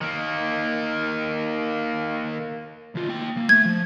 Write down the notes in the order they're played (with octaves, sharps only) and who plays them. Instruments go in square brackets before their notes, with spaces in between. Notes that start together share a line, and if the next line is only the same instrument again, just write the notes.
[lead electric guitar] D#3 A#3
D#2 F4
A#3 G5
A#3
[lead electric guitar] A3 [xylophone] G#6
[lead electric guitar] F3